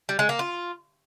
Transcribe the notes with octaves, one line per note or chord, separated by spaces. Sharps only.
G3
G#3
A#3
F4